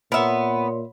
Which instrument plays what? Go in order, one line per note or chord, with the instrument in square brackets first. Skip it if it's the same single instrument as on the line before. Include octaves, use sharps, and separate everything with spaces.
[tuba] A#2 [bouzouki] B3 [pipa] A#4 E5 [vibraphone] C#5 C6